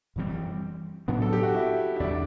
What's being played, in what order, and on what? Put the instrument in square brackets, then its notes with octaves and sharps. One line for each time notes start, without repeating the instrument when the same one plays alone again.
[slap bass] F#2 E3 G3 C4
A2 F#3 B3 D4
[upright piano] A4
G4
F#4
E4
E4
[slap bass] E2 D3 G3 [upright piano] D4